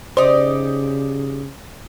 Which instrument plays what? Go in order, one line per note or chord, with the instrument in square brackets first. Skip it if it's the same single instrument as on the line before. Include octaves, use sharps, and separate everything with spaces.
[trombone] C#3 [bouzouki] D#4 G4 D5 [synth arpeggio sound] C5